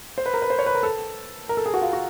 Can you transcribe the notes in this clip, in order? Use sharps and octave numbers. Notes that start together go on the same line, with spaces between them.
C5
B4
A#4
B4
C5
C#5
B4
A#4
A4
A#4
A4
G#4
F#4
F4
F#4